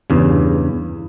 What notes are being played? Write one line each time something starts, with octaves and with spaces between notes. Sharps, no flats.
E2 G2 C#3